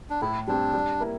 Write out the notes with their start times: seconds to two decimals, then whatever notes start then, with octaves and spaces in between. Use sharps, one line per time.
0.10 D4
0.21 A2 E4
0.47 G3 C4 D4 G4
0.74 G3
1.00 A#3 E4 A#4